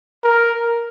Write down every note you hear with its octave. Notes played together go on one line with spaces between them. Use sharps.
A#4